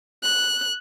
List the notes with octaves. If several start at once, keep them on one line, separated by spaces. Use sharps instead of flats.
F#6